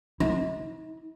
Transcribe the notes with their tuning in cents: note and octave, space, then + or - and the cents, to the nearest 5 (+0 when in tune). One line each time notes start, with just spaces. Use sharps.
D#4 +45